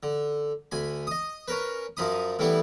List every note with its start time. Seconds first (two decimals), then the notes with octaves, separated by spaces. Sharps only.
0.03 D3
0.72 D2 G#5 B5
1.07 D#5 D#6
1.48 C#4 A#4 B4
1.97 F#2 F3 D#4 B5 D#6
2.39 A2 E3 G3 B3 E4